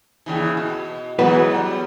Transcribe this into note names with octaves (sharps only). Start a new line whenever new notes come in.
D#2 C#3 E3
B2
E3 F#3 G#3 B3 F#4 B4
F#3 G3